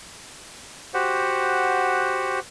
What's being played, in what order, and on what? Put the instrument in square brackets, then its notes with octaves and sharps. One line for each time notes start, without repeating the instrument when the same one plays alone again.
[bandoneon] F#4 G4 C5 F#5